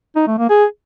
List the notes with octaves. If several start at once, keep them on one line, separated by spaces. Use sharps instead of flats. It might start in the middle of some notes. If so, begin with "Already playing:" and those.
D#4
A3
A#3
G#4